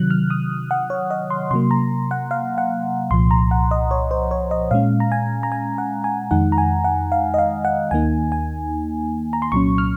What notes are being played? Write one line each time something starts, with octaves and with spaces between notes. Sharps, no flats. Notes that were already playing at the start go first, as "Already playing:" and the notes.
Already playing: C3 D#3 F#3 F#6
F6
D#6
F#5
C#5
D#5
C6
C3 F#3 A#3 C6
A#5
F#5
F5
F#5
C2 A#2 F3 C6
A#5
F#5
D#5
C#5
C5
C#5
D#5
A#2 G#3 C#4 F5
A#5
G#5
A#5
G#5
F#5
G#5
F2 D#3 G#3 D#4 F#5
A#5
G#5
F#5
F5
D#5
F5
F#5
D#2 D#3 A#3 D#4 G#5
G#5
A#5
C6
C2 A#2 F#3 C#4 C#6
F6